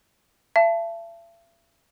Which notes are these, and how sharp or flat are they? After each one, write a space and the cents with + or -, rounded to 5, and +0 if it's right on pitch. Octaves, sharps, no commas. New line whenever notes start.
E5 +40 A5 +0